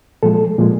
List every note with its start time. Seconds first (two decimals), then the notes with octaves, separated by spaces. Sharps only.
0.23 A#2 F3 G#3 A4
0.58 A#2 F3 G#3